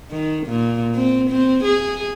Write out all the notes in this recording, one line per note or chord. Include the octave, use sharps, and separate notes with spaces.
D#3
A#2
C4
C4
G#4